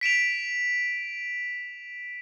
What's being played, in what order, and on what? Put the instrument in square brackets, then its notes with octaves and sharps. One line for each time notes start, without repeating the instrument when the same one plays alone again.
[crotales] B6 D7 E7 F7